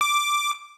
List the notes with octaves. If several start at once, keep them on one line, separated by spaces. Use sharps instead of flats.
D6